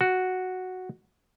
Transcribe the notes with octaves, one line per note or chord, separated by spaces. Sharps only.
F#4